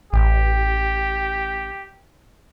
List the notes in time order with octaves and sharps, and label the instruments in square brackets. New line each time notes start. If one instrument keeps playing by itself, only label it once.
[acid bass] A1 [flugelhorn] G4